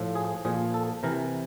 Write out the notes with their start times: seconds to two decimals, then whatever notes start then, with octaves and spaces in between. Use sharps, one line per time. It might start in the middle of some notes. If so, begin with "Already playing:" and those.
Already playing: A2 F3
0.15 G#4
0.45 A#2 F3 G#4
0.74 A4
1.03 C3 E3 A#4